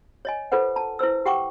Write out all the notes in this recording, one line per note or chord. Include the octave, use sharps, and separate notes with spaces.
C#5 D#5 G#5
F4 A4 B4 C5 F#5
A5 A#5
E4 B4 C5 E6
G4 F#5 G5 C#6 D6